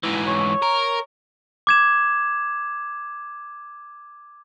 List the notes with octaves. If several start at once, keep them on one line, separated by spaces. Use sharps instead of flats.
G#2 E3
C#5
A#4
D6 G#6 E7